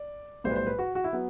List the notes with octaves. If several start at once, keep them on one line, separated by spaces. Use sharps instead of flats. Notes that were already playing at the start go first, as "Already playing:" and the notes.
Already playing: D5
B1 A2 G3 C5
B4
C5
B4
F#4
F#4
E4
F#3 B3